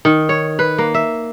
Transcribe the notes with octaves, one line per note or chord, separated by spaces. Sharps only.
D#3
C#5
B4
A#3
E5